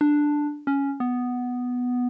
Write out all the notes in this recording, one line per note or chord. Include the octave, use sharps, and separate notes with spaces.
D4
C#4
B3